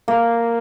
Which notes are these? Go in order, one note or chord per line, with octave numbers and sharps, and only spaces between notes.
A#3